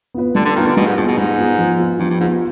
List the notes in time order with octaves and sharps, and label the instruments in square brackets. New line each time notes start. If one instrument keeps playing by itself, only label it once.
[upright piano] B3 F4 B4
[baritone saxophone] D3 [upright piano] G3
[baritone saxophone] D3
[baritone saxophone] D#3 [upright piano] B3 F4 B4
[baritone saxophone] D3
[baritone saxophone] B2 [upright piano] G3
[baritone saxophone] G#2
[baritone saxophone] G2 [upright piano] B3 F4 G#4
[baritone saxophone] B2
[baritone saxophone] G#2 [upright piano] G3
[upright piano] B3 F4 G#4
F3
B3 F4
[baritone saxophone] G2 [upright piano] F3
[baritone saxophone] G2
[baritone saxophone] G#2 [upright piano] B3 F4